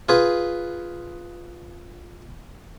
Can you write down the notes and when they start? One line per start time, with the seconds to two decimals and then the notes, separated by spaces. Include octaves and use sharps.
0.09 F4 G#4 B4